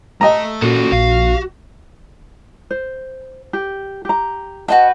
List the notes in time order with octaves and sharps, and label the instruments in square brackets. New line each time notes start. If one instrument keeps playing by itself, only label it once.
[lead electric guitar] A3 A5 [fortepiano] D#5 A#5
[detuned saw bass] A#2 [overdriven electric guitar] C#4 A4 [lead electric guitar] F#4
[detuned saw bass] A#1 [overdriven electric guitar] F5
[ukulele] C5
G4
G4 A#5
[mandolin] F#4 B4 G5 [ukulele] D#5 F#5 A5